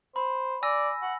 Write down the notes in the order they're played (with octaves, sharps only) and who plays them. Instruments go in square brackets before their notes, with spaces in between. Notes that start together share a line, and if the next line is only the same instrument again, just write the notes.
[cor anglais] C5 [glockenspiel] B5
[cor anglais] D5 [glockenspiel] G#5 E6 A#6
[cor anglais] F#5